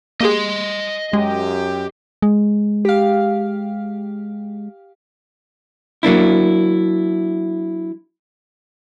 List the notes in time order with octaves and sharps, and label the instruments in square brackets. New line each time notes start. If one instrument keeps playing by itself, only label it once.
[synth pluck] A#3 G4 G#4 [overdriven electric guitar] D#5 C6
[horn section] F#2 G4 [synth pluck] G#3
[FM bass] G#3
[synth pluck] G4 F5
[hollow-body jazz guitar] F#3 A#3 D4 E4